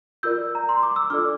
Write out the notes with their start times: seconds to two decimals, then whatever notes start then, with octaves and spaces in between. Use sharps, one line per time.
0.23 F4 A#4 D5 E6 G6
0.55 A#5
0.69 C6
0.83 D6
0.96 E6
1.10 D4 F4 A4 D5 D6 F6